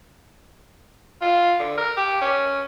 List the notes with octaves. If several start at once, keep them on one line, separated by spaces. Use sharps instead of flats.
F4
D3
A#4
G4
C#4